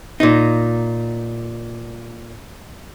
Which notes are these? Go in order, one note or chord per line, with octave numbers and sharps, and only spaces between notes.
A#2 D#4